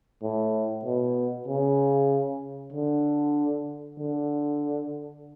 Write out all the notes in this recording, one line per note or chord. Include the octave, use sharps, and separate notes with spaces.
A2
B2
C#3
D3
D3